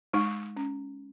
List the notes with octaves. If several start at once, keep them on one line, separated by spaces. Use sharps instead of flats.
G#3 D#4
C#4